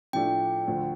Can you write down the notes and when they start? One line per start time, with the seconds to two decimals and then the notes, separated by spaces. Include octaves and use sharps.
0.13 A2 F3 A3 D4 F4 G5
0.68 D2 D3 F3